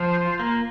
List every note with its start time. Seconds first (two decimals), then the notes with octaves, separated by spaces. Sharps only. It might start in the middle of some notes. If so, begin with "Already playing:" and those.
Already playing: F3 C5
0.17 F4
0.39 A#3